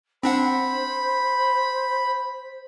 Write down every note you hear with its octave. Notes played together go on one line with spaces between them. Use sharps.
C4 D4 C5 F#5 B5